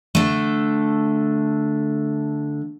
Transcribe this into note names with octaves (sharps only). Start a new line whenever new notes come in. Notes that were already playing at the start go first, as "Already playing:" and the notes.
D3 A3